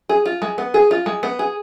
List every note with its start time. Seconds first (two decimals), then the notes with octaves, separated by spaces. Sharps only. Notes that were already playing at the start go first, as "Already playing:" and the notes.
0.09 G#4
0.26 F4
0.42 G#3
0.58 B3
0.74 G#4
0.91 F4
1.06 G#3
1.23 B3
1.39 G#4